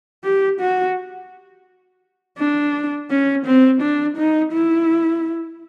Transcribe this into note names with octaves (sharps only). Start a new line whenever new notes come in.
G4
F#4
D4
C#4
C4
D4
D#4
E4